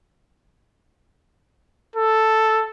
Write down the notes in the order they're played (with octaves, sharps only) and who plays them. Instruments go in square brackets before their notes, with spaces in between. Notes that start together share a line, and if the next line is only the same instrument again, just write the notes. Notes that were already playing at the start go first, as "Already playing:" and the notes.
[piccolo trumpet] A4